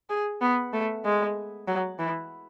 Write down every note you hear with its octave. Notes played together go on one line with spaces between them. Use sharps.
G#4
B3
A3
G#3
F#3
E3